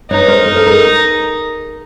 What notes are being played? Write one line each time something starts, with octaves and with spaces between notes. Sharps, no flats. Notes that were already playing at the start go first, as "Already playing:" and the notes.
D#4 B4 C#5
A#4 C5
A#4
A4
G#4 A#4